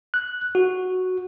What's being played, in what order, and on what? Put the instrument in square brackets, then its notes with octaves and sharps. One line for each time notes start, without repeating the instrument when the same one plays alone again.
[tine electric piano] F#6
F#4